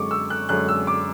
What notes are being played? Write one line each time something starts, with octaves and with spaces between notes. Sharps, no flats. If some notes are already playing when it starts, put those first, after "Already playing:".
Already playing: F#2 D3 G#3 C#6 D6
E6
F#6
F#2 D3 G#3 F#6
E6
D6